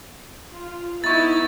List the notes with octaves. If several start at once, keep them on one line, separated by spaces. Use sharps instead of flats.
F4
B3 D#4 E4 C#6 A6